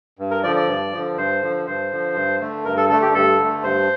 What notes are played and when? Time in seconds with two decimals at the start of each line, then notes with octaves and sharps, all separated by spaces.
0.19 G2
0.31 A#4
0.43 D3 F3 D5
0.56 D5
0.68 G2
0.93 D3 F3
1.17 G2 C5
1.42 D3 F3
1.66 G2 C5
1.91 D3 F3
2.15 G2
2.41 D3 A3
2.65 G2 A#4
2.77 A4
2.89 D3 A3 A4
3.02 G4
3.14 G2 A4
3.39 D3 A3
3.64 G2 C5